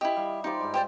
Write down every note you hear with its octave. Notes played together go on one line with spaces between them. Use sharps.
E4 G4 D#5 E5
G3 E5 F5
D#4 F4 G4 C5 D5
G#2 G3
G4 C5 D5